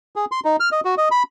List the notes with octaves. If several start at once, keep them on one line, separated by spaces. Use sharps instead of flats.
G#4
C6
D#4
F6
D#5
F#4
D#5
B5